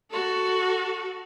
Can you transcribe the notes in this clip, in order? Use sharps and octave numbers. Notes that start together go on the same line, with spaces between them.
F#4 A4